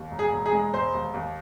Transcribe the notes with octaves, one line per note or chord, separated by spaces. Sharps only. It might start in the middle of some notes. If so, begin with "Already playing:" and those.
Already playing: D#2
E1
G#4
E1
G#4
G#3
E1 C5
D#2
D#2